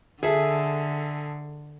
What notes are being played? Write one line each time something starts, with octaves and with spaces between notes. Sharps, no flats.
D3 G#4 A4 E5